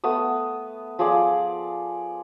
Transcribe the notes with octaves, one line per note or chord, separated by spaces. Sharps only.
A3 B3 D#6
F3 G#4 D5